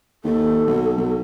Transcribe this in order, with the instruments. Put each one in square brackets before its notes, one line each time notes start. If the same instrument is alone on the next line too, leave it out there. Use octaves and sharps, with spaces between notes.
[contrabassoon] D#2 [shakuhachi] A4
[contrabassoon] B1
B1